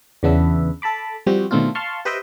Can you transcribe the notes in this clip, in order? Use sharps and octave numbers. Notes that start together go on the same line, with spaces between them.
E2 C#3 B3 D4 B4 E5
A4 A5 B5 D6
F3 G3 C4 F#4 G4
B2 D#3 A3 C4 D4 F4
F5 A5 C6 C#6
G4 B4 C5 D#5 E5 G5